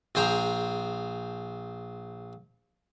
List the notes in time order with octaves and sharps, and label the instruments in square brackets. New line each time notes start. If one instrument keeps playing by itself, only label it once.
[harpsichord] A#1 G#4 C5 G5 A#5